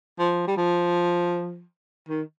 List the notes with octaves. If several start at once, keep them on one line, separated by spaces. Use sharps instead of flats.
F3
G3
F3
D#3